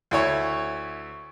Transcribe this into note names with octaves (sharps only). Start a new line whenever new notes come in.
D2 E4 C#5